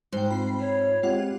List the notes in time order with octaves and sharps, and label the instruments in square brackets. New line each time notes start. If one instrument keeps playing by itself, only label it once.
[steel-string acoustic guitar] G#2 [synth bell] C5 G5
[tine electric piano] C4 F4 [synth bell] B5 C7
[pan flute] C#5
[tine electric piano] G#3 C4 G4 [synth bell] F4 F#5